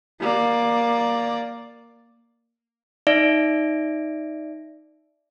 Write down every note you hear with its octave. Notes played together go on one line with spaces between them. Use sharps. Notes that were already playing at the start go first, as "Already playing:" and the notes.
A#3 D5
D#4 D5 E5 A#6 D7